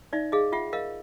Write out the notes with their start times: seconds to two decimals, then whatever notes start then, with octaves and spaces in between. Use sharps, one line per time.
0.13 D#4 D5 E5
0.32 G#4 D#5 F5
0.52 F4 E5 F#5
0.73 A#4 D#5 F5